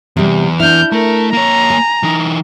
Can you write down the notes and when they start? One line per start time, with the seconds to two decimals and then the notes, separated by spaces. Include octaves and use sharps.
0.17 E2 C3 G3
0.60 D4 E4 F6 G6
0.92 A3 A#4
1.33 A#3 C#5 A#5
1.70 G#5
2.03 E3 D#4